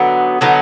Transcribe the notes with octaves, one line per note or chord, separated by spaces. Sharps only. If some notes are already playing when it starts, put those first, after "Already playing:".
Already playing: D3 F#3 B3 D#4
D3 F#3 B3 D#4